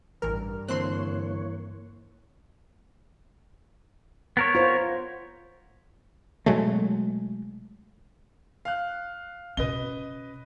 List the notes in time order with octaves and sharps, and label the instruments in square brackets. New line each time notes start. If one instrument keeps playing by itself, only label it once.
[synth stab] A1 A#4 [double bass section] G2
[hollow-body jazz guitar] D3 C4 [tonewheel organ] E3 A#3 C#5 [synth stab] C6 F#6
[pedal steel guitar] B3 A#4 C#5
[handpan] F4 C5
[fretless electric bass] B2 F#3 G#3 A3
[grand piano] F5 F#6
[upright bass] B2 C#4 [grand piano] B4 D#5 G7